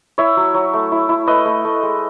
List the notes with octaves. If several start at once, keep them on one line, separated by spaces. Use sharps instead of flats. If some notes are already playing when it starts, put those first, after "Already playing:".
E4 C#5 E5
F#3
F#3
A3
E4
E4
A3 B4 D#5
A3
A3
G#3